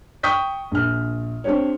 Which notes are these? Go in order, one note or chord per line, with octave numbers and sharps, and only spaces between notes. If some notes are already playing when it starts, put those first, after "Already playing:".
G5 C#6 D#6 G6 B6
A#1 F6
C4 D4 G4 C#5